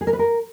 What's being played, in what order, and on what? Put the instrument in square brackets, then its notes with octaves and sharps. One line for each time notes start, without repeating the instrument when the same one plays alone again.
[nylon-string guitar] G#4
A#4
B4
A#4